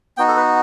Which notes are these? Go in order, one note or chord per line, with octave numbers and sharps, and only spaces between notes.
B3 D#4 F#4 G5
A4
B4